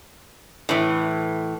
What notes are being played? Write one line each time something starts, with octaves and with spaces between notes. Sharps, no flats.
A2 E3